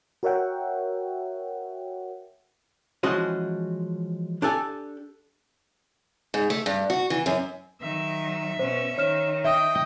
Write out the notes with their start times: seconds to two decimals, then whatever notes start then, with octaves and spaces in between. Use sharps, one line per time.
0.23 F#4 A#4 C#5 E5 F#5 G5
3.03 E3 F3 G#3 C#4 F#4 D#5
4.42 D4 G4 A4 G#5
6.34 G#2
6.50 A3
6.66 G2
6.90 F#4
7.10 E3
7.26 F#2
7.82 D#3 F#3 E5
8.59 B2 C#4 C5
8.98 D#3 C#5 F6 E7
9.44 D#5 E5 G5